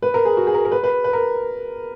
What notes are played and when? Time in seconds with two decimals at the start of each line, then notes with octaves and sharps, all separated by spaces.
0.02 B4
0.14 A#4
0.25 G#4
0.37 F#4
0.47 G#4
0.54 A#4
0.65 A#4
0.72 B4
0.84 B4
1.04 B4
1.13 A#4